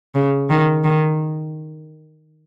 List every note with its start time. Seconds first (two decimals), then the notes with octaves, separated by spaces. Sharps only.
0.15 C#3
0.50 D#3
0.84 D#3